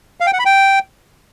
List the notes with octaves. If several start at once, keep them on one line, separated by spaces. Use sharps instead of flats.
F5
G5
F#5
B5
G5